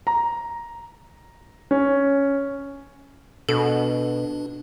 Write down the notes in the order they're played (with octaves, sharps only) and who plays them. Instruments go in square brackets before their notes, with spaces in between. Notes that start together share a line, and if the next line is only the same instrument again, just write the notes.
[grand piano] A#5
C#4
[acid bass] B2 [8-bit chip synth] D4 [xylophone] A4